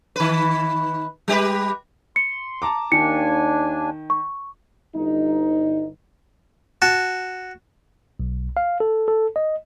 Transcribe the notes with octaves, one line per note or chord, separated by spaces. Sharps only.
D#3 B4
G3 G4 B4
C6 C#7
A5 A#5 D6
D#2 D#3 D4 G#5 C#7
C#6
G1 D#4
F#4 A5
B1
F5
A4
A4
D#5